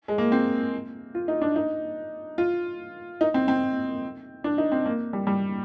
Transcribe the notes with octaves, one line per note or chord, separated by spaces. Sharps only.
G#3
A#3
C4
F4
D#4
D4
D#4
F4
D#4
C4
C4
D4
D#4
C4
A#3
G3
G3